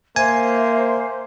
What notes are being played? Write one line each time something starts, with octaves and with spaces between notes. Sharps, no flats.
A#3 C5 E5 G#5